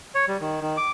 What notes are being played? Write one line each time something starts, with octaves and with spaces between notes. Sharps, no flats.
C#5
G3
D#3
D#3
D6